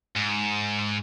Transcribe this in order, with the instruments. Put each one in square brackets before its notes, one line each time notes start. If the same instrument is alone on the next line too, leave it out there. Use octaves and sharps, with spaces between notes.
[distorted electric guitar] G#2